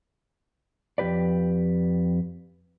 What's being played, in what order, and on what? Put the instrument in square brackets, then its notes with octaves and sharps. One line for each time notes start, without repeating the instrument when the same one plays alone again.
[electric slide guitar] F2 F#3 G4 B4 D5